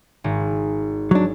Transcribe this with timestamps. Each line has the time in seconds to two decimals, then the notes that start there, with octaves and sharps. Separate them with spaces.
0.24 G#1
1.11 F#3 D4